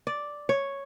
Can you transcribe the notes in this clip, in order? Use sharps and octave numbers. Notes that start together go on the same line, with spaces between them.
D5
C#5